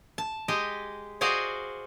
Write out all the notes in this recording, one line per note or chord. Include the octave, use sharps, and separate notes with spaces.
A5
G#3 G4 D#5
F#4 G#4 C5 D5 D#5 F5